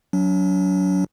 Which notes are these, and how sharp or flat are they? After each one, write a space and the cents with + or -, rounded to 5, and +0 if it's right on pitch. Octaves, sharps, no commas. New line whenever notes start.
F#3 +0 D4 -45